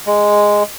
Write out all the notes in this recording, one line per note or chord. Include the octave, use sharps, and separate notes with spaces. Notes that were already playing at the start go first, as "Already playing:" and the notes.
G#3